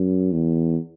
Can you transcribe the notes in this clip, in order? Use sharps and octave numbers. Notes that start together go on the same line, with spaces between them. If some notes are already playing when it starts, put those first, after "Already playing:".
Already playing: F#2
E2